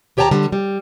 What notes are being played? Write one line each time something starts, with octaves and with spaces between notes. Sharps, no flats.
D#2 G4 C#5 G5 A5 A#5
D3 G3
G3